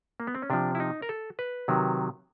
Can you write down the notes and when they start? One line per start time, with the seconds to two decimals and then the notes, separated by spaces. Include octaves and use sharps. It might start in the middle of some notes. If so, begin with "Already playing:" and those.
0.20 A#3
0.27 B3
0.35 C4
0.42 C#4
0.50 C3 F3 D4
0.75 E4
0.80 D#4
1.02 A#4
1.09 A4
1.39 B4
1.68 C3 D#3 F#3